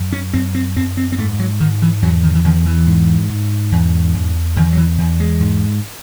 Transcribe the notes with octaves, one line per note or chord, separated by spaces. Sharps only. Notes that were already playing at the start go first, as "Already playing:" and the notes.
Already playing: F#2
C#4
F#2 C4
C4
F#2 C4
C4
C4
G#2 A3
F#3
G#2 D#3
E3
E2 F#3
D#3
E3
E2 D#3
E3
G#2
G#2
E2
E2
E2 D#3
F#3
E3
E2
G#3
G#2